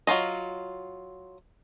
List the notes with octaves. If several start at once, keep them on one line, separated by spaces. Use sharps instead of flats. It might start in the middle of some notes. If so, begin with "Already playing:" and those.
F#3 A#3 F4 D#5